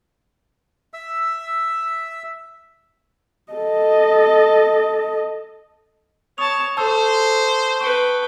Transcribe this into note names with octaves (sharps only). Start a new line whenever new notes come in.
E5 E6
A4 D#5
C#5 A5 C#6 D#6 F7
A4 C5 A5 E6
B4 G5 C#6 C#7